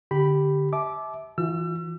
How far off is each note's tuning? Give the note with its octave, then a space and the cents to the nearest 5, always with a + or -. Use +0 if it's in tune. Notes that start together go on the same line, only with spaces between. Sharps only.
D3 +0 G4 -5 B5 +0
E5 -20 A5 -35 D6 +0
E3 +0 F4 +40 E6 +40